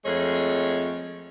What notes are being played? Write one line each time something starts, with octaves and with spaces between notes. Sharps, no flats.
F2 G#3 A3 C#5